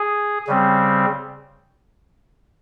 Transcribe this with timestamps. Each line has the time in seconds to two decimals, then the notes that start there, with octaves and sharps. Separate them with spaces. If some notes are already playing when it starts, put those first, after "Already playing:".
Already playing: G#4
0.47 C#3 G3 C4